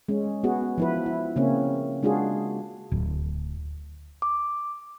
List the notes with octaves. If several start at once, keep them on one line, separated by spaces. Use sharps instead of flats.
G#3 C#4
B3 F#4 G#4
F3 E4 B4
E4
C#3 A#3 C4 C#4
G#3 D4 F4 F#4 G#4
D1
D6